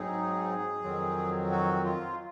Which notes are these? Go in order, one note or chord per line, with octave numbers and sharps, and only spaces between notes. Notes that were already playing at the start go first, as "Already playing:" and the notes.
Already playing: G#2 F#3 C4 D#4 G#4
F2 D#3 F#3 C4
F#4
F4